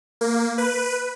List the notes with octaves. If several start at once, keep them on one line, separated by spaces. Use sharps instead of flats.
A#3
B4